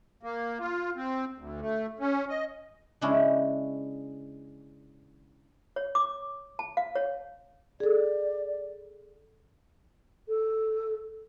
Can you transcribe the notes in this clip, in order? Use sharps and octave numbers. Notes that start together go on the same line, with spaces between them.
A#3
F4
C4
D2
A3
C#4
D#5
C#3 G#3 C#4 D4 E4
C#5
D6
A5
F5
C#5
G#4 A4 D5
A4